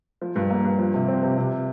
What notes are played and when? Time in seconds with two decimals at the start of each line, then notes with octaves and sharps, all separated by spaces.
0.22 F3
0.36 G2
0.50 A#3
0.64 G2
0.79 F3
0.94 C3
1.08 C4
1.23 C3
1.38 C3